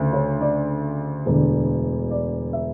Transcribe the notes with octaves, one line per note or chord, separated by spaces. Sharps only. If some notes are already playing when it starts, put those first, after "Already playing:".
Already playing: D2 C#3
C#5
D5
E1 D2 D3
D5
E5